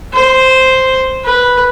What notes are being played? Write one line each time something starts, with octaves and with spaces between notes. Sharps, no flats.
C5
B4